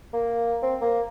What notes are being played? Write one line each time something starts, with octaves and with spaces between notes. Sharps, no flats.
A#3
C4
A#3